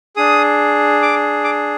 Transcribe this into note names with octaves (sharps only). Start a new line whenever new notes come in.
D4 G#4 D#6
D6
D6